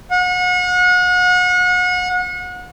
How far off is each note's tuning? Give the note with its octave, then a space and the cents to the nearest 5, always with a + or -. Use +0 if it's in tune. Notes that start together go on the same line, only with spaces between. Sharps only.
F#5 -35